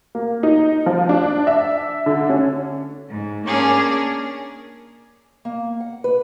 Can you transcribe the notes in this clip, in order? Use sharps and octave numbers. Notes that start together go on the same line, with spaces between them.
A#3
D#4
F3
D4
E5
D3
C#4
G#2
A#3 C#4 D4 G#4 A#4
A#3
F#5
B4